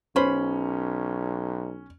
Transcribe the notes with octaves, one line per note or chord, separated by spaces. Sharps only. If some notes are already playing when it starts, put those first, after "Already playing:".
B1 C#4 B4 C5 B5